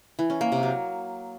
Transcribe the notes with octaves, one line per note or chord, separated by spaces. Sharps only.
E3
C#4
A#3
C3
F#3